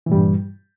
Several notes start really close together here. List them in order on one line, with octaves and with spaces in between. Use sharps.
E3 A#2 G3 G2